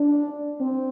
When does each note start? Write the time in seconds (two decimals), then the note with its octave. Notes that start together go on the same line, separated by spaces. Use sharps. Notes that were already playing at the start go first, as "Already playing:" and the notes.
Already playing: D4
0.60 C4